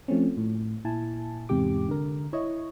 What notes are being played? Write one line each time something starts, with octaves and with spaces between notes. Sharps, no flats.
F3 A3 C4 C#4
A2
A#2 E4 G#5 A5
E2 G#2 C3 G4 D6
D3 A#4
E4 C#5 D#5